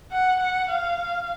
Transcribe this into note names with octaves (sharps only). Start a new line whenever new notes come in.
F#5
F#5
F5